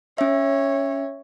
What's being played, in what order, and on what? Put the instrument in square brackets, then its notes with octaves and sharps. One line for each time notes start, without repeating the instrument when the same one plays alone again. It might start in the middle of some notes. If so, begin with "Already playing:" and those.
[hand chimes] C#4 E5 [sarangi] C#5